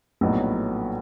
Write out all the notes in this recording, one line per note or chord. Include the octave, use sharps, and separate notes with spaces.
A#1 A2 F#3 B3 D#4